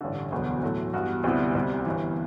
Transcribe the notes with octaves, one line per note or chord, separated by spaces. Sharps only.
A1 G2 D3
E1 D2 D3 F#3 B3
A2 F#3 A3
G2 E3 B3 F#4
D2 C3 G3 B3 E4
C2 C3 G3
G1 G2 E3